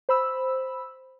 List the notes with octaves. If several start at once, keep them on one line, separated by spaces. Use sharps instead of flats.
C5 B5 E6